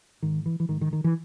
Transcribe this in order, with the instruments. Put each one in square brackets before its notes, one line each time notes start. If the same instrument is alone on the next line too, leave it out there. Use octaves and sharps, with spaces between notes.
[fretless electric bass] G#2 D#3
E3
E3
G#2 D#3
D#3
D#3
E3